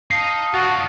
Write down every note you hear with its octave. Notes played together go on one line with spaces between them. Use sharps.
D#4 D#5 F5 A5 D#6 C7
D3 F4 F#4